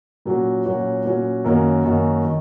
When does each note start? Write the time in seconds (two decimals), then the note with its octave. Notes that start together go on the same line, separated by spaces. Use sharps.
0.25 A#2 F#3 C#4 F#4
0.65 A#2 F#3 C#4 F#4
1.05 A#2 F#3 C#4 F#4
1.45 F#2 D#3 A#3 C#4 F#4
1.85 F#2 D#3 A#3 C#4 F#4
2.25 D#3